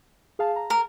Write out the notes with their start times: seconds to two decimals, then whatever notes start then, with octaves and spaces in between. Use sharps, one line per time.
0.39 G#4 F5 A5
0.56 A#5
0.70 A#4